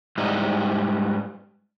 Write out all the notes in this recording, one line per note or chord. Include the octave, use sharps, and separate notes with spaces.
G#2 G3 D#4 E4